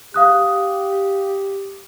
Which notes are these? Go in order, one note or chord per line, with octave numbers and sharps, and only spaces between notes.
G4 F5 D#6 F#6